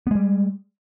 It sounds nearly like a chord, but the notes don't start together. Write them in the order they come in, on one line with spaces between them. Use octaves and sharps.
B3 G#3 G3